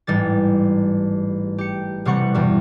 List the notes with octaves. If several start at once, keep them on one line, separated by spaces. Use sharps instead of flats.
A1 G#2 G3 A6
G4 C#7
E1 C3 G3 B4 F#5 C#6
E2 G2 B2